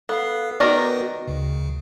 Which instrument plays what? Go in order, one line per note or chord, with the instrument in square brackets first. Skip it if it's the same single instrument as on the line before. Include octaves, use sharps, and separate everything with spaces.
[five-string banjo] B3 [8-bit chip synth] A4 F5 C7
[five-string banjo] D#3 A#4 D5 [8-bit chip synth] B3 F#4 B4
[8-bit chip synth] D2 C#3